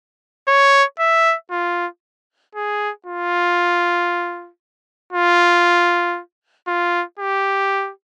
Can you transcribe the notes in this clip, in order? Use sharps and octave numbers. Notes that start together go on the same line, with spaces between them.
C#5
E5
F4
G#4
F4
F4
F4
G4